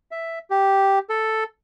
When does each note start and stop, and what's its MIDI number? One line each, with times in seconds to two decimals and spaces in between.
0.11 0.39 76
0.50 0.99 67
1.10 1.44 69